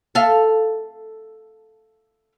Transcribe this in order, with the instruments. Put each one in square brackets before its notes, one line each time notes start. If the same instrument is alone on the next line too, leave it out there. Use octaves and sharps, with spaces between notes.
[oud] A4 E5 F5